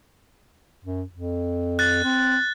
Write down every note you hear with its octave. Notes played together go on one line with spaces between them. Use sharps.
F#2
F2
F#6 A6
C4